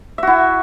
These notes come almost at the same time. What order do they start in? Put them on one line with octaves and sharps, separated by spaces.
E5 F#4 E4